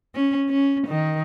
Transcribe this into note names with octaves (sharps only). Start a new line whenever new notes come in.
C#4
C#4
D#3